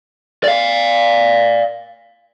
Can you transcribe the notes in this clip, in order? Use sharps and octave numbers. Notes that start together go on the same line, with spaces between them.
D5 F5